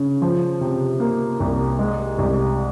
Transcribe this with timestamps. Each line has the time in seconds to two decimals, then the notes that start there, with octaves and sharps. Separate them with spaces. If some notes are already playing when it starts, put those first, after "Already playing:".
Already playing: C#3
0.22 F3
0.61 C3
1.00 A#3
1.40 C2
1.79 G#3
2.18 C2